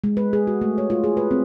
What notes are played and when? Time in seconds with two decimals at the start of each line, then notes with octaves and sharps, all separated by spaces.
0.04 G#3
0.17 B4
0.33 G#4
0.47 F#4
0.61 A3
0.78 C#5
0.90 F4
1.04 G#4
1.17 B4
1.31 C4